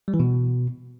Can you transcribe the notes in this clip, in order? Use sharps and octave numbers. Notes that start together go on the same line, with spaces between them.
G3
E3
B2